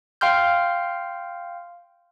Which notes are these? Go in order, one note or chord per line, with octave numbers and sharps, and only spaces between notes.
F5 G5 C6 F6 G6